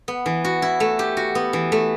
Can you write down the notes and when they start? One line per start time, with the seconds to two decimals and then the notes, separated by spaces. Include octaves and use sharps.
0.08 B3
0.26 E3
0.44 F#4
0.62 E4
0.80 A3
0.99 G4
1.17 F#4
1.35 B3
1.53 E3
1.72 A3